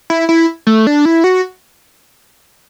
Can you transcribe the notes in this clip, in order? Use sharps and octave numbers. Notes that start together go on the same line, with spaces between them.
E4
E4
A3
D4
E4
F#4